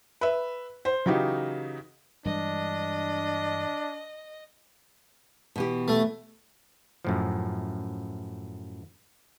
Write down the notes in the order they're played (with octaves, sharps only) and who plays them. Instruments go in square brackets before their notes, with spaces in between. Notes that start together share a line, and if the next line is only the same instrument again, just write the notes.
[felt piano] B4 E5
C5
C#3 E3 F#3 D#4 G4
[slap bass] G2 E3 G#3 [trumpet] D4 [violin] D#5
[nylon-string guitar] B2 E3 G4
[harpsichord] A3
[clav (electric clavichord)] F#2 A2 F3